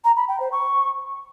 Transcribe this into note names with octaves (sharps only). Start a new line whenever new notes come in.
A#5
B5
G5
C5
C#6